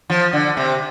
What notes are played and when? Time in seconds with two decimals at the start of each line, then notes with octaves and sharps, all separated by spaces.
0.10 F3
0.33 D3
0.57 C3